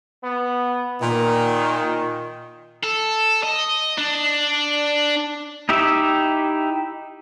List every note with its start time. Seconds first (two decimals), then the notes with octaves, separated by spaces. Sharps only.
0.24 B3
1.01 A#2 D#3
2.83 A4
3.43 D#5
3.98 D4
5.69 D#4 E4 G4 E5